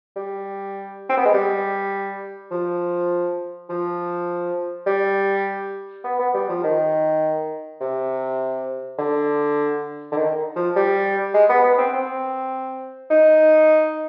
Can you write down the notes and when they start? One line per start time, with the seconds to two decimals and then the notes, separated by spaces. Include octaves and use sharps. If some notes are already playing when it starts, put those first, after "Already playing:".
0.16 G3
1.09 C4
1.18 B3
1.25 G#3
1.34 G3
2.51 F3
3.70 F3
4.87 G3
6.04 B3
6.19 B3
6.34 G3
6.49 F3
6.64 D#3
7.81 C3
8.98 D3
10.12 D3
10.17 D#3
10.56 F3
10.76 G3
11.34 G#3
11.49 B3
11.64 B3
11.78 C4
11.93 C4
13.11 D#4